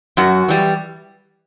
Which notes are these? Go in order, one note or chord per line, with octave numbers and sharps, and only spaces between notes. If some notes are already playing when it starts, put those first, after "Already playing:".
F#2 F#4
E3 G3